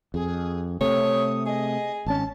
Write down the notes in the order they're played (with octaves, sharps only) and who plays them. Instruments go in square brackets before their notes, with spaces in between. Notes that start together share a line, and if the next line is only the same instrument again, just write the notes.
[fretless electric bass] F2 [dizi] G#4
[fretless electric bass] C3 A3 [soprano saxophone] C#5 [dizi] D#6
[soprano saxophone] G#4 [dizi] D#5
[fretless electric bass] G#1 C#4 [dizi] A5